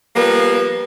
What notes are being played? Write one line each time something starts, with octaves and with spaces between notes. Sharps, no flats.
F3 G3 A#3 B3